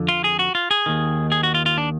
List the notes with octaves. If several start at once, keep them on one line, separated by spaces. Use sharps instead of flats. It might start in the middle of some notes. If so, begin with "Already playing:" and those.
Already playing: F2 D3
F4
G#4
F#4
F4
G#4
D#2 D#3
G#4
F#4
F4
F4
D4